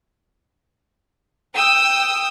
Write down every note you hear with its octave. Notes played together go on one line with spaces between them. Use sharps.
G5 D#6 E6